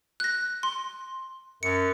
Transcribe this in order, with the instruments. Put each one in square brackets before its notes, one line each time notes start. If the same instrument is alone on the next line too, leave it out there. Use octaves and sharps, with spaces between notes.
[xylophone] F#6 A#6
C6
[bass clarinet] F#2 [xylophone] C#7